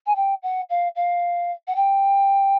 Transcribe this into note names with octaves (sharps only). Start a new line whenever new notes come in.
G#5
G5
F#5
F5
F5
F#5
G5